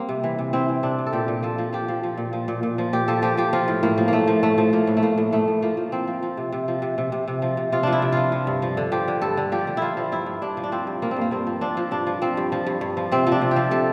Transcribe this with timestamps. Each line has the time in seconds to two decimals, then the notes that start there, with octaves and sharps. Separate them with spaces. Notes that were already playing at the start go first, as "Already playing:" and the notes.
Already playing: G3 A#3 C4
0.09 C3
0.24 E3
0.39 C3
0.53 E3 C4
0.68 E3
0.83 C3 D4
0.99 C3
1.06 A4
1.13 A#2 G4
1.28 A#2
1.43 F3 A4
1.58 F3
1.73 F3 G4
1.88 F3
2.03 F3
2.18 A#2
2.33 F3
2.48 A#2
2.63 A#2
2.78 F3
2.93 A#2 G4
3.08 F3 A4
3.22 F3 G4
3.37 F3 G4
3.53 F3 F4
3.68 A2
3.83 A2 A#3
3.98 F3
4.08 A2 A3 A#3
4.28 F3
4.43 A2 A3
4.58 F3
4.73 F3 A#3
4.87 A2
4.97 A3
5.02 A2 A#3
5.18 A2
5.32 A2 A3
5.48 A2
5.62 F3 A#3
5.77 F3
5.92 F3 C4
6.07 F3
6.23 F3
6.37 C3
6.53 C3
6.68 F3
6.82 C3
6.98 C3
7.12 C3
7.28 C3
7.42 F3
7.57 C3
7.72 C3 F4
7.83 F3 D4
7.93 E4
8.02 C3
8.12 F3 F4
8.32 F3
8.47 G2
8.62 F3
8.77 D3
8.92 F3 G4
9.08 D3
9.22 G2 A4
9.37 D3
9.52 F3 G4
9.67 D3
9.77 D3 E4 F4
9.97 F3
10.12 G2 E4
10.26 G2
10.42 G2 D4
10.57 F3
10.64 D4
10.72 F3 C4
10.87 G2
11.02 F3 A#3
11.11 C4
11.16 G2 A#3
11.31 G2 C4
11.47 F3
11.61 F3 D4
11.77 F3
11.91 G2 D4
12.07 F3
12.22 F3 C4
12.37 G2
12.52 F3
12.67 G2
12.81 G2
12.97 F3
13.12 C3 C4
13.27 F3
13.32 D4
13.41 C3
13.51 G4
13.56 F3
13.71 C3 A4